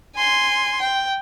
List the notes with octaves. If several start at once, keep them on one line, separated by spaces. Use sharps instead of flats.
G#5 C6
G5